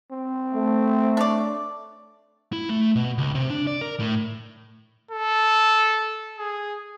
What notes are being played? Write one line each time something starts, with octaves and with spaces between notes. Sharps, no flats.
C4
A3
D4 C#5 D5
E4
A3
B2
C#2
C3
D4
D5
A#4
A2
A4
G#4